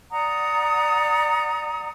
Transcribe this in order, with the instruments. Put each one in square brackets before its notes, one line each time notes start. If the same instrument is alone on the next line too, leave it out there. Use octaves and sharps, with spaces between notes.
[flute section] D5 F#5 A#5 D#6